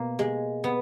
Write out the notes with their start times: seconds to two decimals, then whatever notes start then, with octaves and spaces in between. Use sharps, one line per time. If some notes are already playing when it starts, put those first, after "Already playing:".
Already playing: B2 A#3
0.19 G#3
0.64 B3